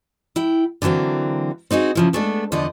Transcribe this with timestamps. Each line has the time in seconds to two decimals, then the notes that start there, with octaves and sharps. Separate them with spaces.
0.36 E4 G5
0.82 D3 E3 F#3 A#3 C4
1.71 C4 D#4 F#4 G#4
1.95 C#3 F3 E4
2.13 G#3 A3 B3 D4 A4
2.52 E2 D3 F3 D5 D#5